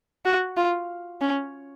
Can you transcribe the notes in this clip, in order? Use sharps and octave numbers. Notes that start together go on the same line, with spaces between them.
F#4
F4
C#4